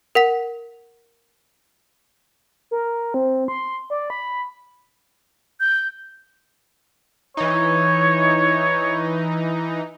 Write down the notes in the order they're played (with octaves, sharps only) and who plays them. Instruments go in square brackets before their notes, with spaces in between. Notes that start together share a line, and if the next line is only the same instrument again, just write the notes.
[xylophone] A#4 F#5 B6
[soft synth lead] A#4
C4
C6
D5
B5
[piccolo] G6
[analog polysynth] E3 D#4 [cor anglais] C#5